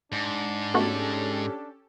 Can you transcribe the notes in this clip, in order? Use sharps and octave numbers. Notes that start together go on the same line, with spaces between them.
G#2 D4
A3 B3 C#4 F#4 G4 A4